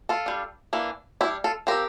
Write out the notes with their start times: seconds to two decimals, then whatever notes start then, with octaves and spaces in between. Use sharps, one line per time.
0.09 F4 A4
0.26 G3 D4
0.73 E3 A#3 D4
1.21 G3 E4 G4
1.24 D4
1.44 F4 A4
1.67 F3 C4 G4 A#4